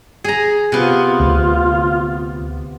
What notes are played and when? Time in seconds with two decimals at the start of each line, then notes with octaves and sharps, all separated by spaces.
0.24 G#4 A#5
0.72 C3 B3 F4
1.20 D2